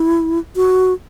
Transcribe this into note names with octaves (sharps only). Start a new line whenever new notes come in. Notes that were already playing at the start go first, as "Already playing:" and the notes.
Already playing: E4
F#4